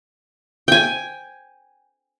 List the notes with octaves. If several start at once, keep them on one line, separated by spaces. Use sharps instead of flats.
G5 G#5